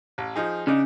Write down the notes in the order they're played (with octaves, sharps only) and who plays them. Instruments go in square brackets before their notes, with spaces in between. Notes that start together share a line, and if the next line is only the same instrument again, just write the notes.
[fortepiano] A1
F3 D#4 G#4
[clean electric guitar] C#3 [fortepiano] D4 D#4